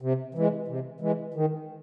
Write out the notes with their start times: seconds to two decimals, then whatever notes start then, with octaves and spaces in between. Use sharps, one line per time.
0.02 C3
0.35 E3 G#3
0.68 C3
1.00 E3 G#3
1.34 D#3